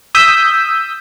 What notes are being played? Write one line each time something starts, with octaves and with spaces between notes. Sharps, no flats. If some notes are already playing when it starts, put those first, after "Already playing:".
D#6 E6 G6 B6